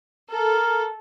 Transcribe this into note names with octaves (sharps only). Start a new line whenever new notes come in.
A4 A#4